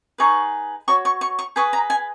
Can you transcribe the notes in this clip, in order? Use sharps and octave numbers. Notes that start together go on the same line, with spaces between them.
D#4 G#4 B4 C#6
F#4 C#5 C#6
C#6
C#6
C#6
G#4 B4 D#5 C#6
A#5
G#5